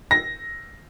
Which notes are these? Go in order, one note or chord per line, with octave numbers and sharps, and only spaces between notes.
A#6